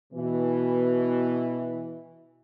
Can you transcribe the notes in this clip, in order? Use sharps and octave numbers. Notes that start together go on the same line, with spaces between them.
B2 E3